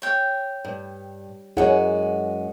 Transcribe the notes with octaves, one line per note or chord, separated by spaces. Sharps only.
C#5 G5
G2
F#2 G#3 E4 F#4 G#4 F#5